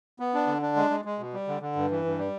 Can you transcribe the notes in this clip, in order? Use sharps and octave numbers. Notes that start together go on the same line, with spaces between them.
B3
D4
D3
D4
G#3
G#3
G#3
B2
G3
D3
D3
G2
E3
G2
G3